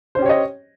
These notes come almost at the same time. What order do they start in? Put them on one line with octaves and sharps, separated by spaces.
C5 C#4 G4 C#5 D#5